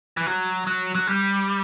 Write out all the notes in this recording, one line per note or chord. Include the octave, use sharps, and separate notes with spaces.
E3
F#3
F#3
F#3
G3